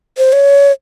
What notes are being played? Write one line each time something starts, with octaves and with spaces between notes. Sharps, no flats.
C5
C#5